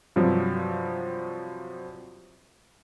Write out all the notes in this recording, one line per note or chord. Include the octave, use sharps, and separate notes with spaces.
G2 C3 F3 F#3